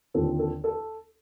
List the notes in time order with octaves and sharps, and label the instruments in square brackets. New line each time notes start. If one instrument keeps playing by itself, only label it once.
[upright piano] D#2 D3 F3 C4 A4
A4
A4